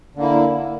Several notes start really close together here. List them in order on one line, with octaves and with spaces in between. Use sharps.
D3 A#3 E4